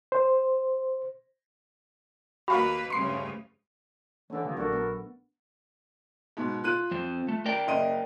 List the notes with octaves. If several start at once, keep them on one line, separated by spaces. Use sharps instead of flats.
C5
D#2 A#3 F#4 B4 F5 B5
D2 G2 C#3 C6 C7
A2 D3 E3 A3 D4
G2 D3 F3 A#3 B3
A#1 F#3 A3 D4 F#4 A4 A#4
B3
G#2 B2
F4 F#6 D#7
F2 C4
A3
A#4 D5 G5
F#1 D#5 D#7